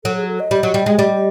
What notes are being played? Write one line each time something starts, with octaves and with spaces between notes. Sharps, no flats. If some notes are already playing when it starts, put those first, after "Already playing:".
F#3 A4
G#4
A4
D#5
G3
F#3
G3
G#3
G3